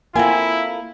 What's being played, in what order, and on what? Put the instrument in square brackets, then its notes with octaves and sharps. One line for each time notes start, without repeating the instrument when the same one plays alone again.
[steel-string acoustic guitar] A#3 F4 A4 [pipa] C4 G#5 [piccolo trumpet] E4